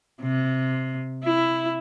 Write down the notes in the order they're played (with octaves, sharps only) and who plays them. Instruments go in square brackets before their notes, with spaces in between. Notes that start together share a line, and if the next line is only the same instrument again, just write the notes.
[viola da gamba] C3
E4